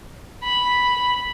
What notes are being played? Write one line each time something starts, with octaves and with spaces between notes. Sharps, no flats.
B5